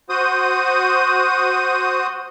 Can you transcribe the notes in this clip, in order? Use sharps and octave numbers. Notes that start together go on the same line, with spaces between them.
F#4 C5 D#6